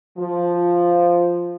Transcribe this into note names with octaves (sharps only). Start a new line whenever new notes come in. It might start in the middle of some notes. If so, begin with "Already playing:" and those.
F3